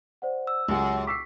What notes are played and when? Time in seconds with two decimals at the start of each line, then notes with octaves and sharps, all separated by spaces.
0.22 C5 D5 F#5
0.47 E6
0.68 C#2 F#2 G4 G#4
1.07 C#6 D6 E6 B6 C7